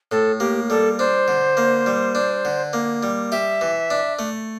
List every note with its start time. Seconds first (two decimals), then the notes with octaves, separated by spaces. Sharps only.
0.11 A2 A4
0.40 A#3 G4
0.69 G3 A4
0.99 D4 C5
1.28 D3
1.57 A#3
1.86 G3
2.15 D4
2.45 D3
2.73 A#3
3.03 G3
3.32 G4 E5
3.61 E3
3.90 D4
4.19 A3